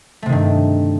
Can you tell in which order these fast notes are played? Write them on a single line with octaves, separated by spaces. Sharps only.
A3 C3 D#3 G2